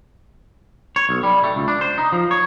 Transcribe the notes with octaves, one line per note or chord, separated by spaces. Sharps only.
C#5
B1
G3
A3
C#2
D4
C5
D#4
F3
C#5